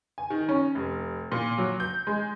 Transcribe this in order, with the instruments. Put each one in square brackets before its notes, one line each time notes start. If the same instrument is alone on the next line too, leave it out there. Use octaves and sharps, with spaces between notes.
[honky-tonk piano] G#5
D#3
C#4
F1
A#2
F#3
G6
G#3